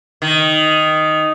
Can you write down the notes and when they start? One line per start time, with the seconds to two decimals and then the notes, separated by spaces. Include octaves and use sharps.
0.22 D#3